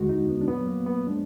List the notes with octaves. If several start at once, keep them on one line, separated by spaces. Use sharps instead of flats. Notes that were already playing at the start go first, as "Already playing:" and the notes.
Already playing: D#2 D3 G#3 F#4
D#4
B3
D4
A#2 F#3 B3
A#3
B3
F3 G#3 D4